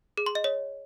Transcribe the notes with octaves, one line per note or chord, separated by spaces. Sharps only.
G#4
C6
D#5
C#5